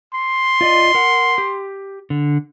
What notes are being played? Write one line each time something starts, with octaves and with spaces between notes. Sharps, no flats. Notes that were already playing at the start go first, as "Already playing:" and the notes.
C6
F4 D5 D#5
A#4 F#5
G4
D3